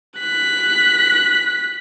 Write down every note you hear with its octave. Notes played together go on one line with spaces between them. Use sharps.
F#6 B6